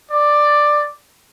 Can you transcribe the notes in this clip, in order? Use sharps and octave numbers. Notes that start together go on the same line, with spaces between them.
D5